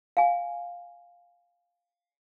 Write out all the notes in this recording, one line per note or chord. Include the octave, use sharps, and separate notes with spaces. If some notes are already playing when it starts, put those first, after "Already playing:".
F5 G#5